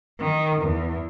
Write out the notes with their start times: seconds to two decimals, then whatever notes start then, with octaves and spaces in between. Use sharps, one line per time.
0.20 D#3
0.62 E2